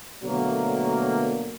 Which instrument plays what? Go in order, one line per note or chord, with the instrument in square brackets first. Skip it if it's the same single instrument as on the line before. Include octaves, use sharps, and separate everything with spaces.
[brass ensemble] B2 D3 F#3 A3 A#3